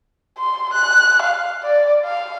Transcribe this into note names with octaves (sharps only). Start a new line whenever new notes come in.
C6
F#6
F5
D5
F5